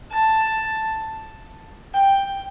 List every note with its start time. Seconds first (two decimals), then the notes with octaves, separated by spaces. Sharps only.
0.12 A5
1.94 G5